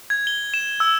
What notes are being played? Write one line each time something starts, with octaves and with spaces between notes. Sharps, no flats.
G#6
G7
E7
E6